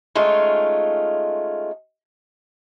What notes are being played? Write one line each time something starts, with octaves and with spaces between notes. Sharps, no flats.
G#3 A3 C#4 D#4 F4